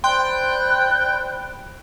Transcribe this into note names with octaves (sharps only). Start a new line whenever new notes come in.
C5 D5 G5 B5 C6 F#6